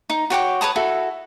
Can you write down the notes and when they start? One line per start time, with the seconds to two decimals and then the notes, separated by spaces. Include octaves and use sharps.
0.10 D#4
0.30 F#4 C#5 G5 D6
0.61 B4 C#5 A5 D#6
0.76 E4 F#4 A4